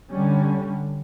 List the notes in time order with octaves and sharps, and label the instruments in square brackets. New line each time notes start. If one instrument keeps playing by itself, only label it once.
[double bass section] D3 G3 C#4